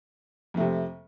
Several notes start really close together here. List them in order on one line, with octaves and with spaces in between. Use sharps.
F2 A3 C3